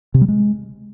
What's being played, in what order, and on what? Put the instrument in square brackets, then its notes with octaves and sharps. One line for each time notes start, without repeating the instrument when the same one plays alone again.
[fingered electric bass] C3
G3
G#3